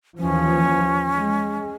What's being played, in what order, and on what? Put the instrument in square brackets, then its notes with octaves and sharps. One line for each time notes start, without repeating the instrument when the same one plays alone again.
[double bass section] D#2 E3 F3 [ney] C#4
[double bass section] G#3